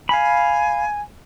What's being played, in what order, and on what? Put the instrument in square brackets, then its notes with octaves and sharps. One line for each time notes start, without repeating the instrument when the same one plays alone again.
[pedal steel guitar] F5 B5 [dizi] G#5